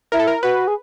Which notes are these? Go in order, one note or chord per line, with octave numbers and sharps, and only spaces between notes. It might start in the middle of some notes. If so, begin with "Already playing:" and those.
E4 A#4
A4
A#4
F#4 B4
G#4